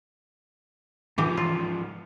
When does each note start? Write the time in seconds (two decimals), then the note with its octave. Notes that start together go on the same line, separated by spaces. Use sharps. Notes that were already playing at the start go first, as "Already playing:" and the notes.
1.18 G#2 E3 F3 G4
1.37 F4